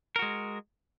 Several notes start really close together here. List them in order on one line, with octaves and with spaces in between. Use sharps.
A#4 F#4 G#3